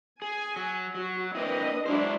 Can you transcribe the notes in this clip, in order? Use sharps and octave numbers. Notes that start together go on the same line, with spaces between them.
G#4 G#5
F#3
F#3 F#4
A#3 C4 D4 E4 B4 D#5
F#3 G#3 C#4 D4 E4 C5